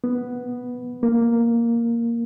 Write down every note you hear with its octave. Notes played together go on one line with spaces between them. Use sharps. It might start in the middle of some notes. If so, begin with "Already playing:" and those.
B3
A#3